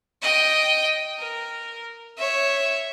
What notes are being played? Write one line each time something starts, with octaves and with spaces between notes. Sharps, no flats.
D#5 G5
A#4
C#5 E5